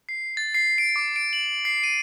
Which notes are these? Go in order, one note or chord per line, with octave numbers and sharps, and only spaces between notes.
C7
A6
C7
D7
D6
D7
F#7
C7
D#7